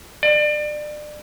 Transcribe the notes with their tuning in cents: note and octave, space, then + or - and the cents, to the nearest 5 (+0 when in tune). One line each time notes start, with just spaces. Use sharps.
D5 +30